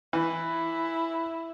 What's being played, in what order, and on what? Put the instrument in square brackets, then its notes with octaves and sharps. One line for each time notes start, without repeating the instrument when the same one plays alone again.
[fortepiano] E3 [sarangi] E4